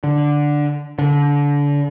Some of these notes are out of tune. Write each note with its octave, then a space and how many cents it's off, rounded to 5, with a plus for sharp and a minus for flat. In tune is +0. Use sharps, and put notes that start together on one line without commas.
D3 +0
D3 -30